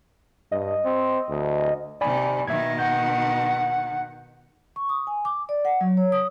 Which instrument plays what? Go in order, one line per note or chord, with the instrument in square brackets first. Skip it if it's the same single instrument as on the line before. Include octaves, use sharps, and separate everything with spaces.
[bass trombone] G2 [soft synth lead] D#5
[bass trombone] C4
D2
[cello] C3 D#3 [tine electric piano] D5 G#5 B5
[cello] B2 D#3 [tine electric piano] E5 G#6
[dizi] F#5 [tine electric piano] G6
[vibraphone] C#6
D#6
G#5
D6
D5
F#5
F#3
C#5
D#6